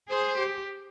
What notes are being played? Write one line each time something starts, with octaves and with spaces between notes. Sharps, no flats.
G#4 C5
G4